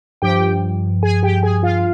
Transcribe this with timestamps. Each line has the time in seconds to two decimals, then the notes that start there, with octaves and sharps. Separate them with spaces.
0.22 G2 F3 G4 G5
1.03 G#4 G#5
1.23 G4 G5
1.43 G#4 G#5
1.63 F4 F5